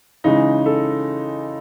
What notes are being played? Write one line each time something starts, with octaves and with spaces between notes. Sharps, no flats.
C#3 E3 G#3 D#4
A4